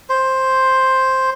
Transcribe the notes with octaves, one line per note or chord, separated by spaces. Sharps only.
C5